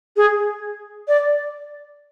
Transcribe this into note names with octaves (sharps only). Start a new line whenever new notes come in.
G#4
D5